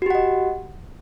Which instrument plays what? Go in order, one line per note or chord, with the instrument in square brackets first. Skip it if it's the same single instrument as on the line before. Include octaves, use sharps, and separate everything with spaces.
[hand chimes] F#4
G4
F#5
D#5